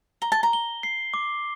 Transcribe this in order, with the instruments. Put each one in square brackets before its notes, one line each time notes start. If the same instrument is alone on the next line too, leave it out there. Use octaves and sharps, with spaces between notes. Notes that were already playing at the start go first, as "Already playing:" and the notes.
[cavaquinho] A#5 [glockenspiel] G7
[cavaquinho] A5
A#5
[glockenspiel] G7
C7
D6